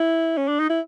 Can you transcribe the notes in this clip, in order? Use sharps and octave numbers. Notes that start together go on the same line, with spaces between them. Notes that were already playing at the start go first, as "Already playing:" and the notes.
Already playing: E4
C#4
D4
D#4
E4